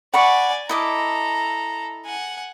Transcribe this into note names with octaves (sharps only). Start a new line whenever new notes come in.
D5 F#5 G#5 B5 C#6
E4 A4 D#5 A#5 D6
F#5 G#5